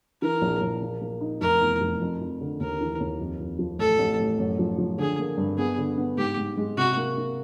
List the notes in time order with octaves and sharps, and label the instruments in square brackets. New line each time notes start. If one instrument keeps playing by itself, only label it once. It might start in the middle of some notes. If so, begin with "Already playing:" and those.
[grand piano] E3 [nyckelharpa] A#4
[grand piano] A#1
A#1
A#3
A#3
D#4
[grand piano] F1 [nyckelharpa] A#4
[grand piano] E2
F1
F2
F2
D3
[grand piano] D#2 [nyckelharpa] A#4
[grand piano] E3
D#2
F2
F2
F3
[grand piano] A1 [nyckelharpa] A4
[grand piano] A1
A1
F#2
F3
F3
[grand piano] D3 [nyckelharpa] G#4
[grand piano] A#3
G2
[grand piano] B3 [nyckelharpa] G#4
[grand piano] D3
B3
[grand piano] G#2 [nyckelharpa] G4
[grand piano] G#2
G#3
[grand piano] C3 [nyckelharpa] F#4
[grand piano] A#3
A#3